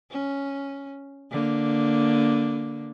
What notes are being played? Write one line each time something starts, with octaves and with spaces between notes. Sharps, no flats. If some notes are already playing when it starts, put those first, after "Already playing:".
C#4
D3 A#3